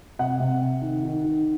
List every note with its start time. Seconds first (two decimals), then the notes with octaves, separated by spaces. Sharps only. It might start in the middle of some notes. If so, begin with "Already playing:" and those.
0.19 C3 F#5
0.40 C3
0.61 C3
0.82 D#3
1.03 D#3
1.24 D#3